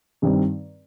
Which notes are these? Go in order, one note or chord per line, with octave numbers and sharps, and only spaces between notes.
G2 D#3 G3 C4